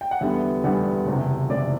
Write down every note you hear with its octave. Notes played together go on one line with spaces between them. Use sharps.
G5
F#5
E2 D3 G3 B3 E5
E2 D3 G3 B3 F#5
F#1 E2 C3
F#1 E2 C3 D5